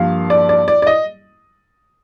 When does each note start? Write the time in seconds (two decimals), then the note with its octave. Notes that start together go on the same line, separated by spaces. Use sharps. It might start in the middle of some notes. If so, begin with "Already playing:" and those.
Already playing: G2 F3 A#3 F5
0.30 D5
0.49 D5
0.68 D5
0.82 D5
0.87 D#5